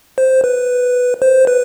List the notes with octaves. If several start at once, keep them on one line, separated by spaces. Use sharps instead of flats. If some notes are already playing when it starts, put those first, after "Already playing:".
C5
B4
C5
B4